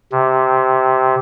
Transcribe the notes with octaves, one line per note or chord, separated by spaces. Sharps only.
C3